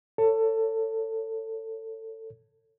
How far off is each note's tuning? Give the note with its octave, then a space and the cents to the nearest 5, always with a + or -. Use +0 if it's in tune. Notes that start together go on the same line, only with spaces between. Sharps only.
A4 +20 C#5 +0